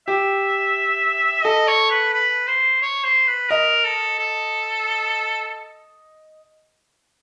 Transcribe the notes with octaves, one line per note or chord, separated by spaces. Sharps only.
G4 E5
A4 D#5
C#5
B4
B4
C5
C#5
C5
B4
A#4 D#5
A4
A4